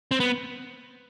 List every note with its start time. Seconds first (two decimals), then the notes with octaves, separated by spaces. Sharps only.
0.11 C4
0.20 B3